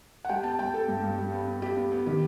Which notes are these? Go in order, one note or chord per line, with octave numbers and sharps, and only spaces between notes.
F#5
G3 G5
B3 A5
G3 G5
B3 A4
G2
G2
G3
B3
B3
B3 G4
B3
B3
D#3 G4